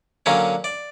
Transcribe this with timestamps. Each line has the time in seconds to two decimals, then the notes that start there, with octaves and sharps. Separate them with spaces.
0.26 D3 F#3 A#3 C#4 C#5
0.64 D5